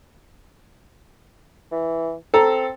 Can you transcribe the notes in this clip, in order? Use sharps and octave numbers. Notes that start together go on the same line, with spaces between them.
E3
C4 A4 A#5